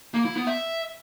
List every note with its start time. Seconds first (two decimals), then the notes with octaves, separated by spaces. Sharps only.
0.14 A#3
0.25 E4
0.36 B3
0.47 E5